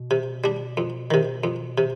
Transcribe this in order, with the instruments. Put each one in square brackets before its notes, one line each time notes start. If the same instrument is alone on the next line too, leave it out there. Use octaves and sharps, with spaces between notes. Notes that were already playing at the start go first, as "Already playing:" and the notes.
Already playing: [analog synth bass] B2
[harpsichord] C3
G3 D4
F2
C3 D#3
F2
C3